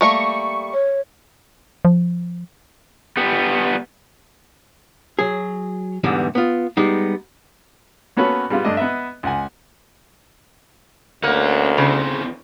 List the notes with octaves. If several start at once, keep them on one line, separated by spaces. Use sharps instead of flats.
G3 A3 A#3 C#6
C#5
F3
G3 B3
F#3 G#4
E2 G#2 D3 E3 G3 B3
B3 F4
G3 G#3 B3 D#4
A#3 B3 C#4 F#4 A4 B4
G3 G#3 B3 F4
G2 A3 D4 D#5
B3 B4 D#5 E5
C#2 F#5 G#5
D2 A#3 C#4 F#5
E2 C#3 C4